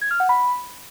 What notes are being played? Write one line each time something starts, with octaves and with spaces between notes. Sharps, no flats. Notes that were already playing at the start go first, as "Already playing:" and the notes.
G#6
F6
F#5
B5